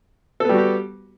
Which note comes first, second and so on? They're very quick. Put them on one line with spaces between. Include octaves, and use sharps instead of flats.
A4 B3 G3 F#4 G4